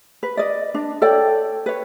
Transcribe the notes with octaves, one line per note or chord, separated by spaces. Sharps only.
B4
D5 D#5
D4
A4 C#5 D5 G5
B4 C#5